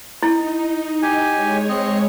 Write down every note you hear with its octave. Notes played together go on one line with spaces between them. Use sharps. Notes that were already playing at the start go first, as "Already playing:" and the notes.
D#4 E4
G4 G#5
G#3 C#5
C4 D#5